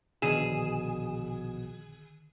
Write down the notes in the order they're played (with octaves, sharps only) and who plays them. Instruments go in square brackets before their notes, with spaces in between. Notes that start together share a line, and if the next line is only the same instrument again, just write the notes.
[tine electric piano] A#1 B2 [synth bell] D3 D#3 E7 [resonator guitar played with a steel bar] G#4